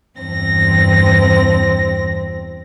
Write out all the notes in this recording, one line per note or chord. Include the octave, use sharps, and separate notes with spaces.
E2 G2 C4 A#6